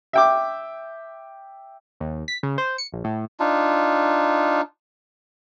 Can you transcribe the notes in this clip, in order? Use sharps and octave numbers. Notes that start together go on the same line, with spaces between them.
E5 G5 D6
D#2
B6
C#3
C5
C#7
A#1
A2
D4 D#4 F4